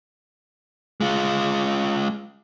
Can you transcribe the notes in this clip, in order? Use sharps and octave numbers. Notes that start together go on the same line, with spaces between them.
G#3 F4